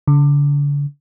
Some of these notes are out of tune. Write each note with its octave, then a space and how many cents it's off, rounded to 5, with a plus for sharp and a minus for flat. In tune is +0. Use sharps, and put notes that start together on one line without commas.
D3 -40